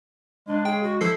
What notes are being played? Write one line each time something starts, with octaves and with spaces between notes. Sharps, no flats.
G#3 D4
G#4 G5
F#4
F3 E4 A4 C7